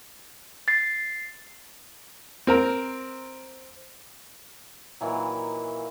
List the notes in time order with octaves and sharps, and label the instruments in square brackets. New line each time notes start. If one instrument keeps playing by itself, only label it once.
[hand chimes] A6 C7
[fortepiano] C4 A#4 A#5
[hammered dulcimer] A#2 D#3 E3 F#3